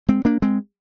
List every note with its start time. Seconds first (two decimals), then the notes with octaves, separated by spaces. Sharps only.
0.09 G#3 C4
0.25 A#3 D4
0.42 G#3 C4